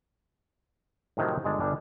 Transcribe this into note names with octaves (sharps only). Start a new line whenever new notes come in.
A2 C3 D#3 F3 F#3
G1 G#3 D5 A5
G1 G3 D4 G#5